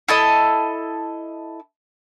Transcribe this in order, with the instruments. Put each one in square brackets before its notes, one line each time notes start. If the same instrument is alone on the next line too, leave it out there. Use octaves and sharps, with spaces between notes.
[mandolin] E4 A4 D#5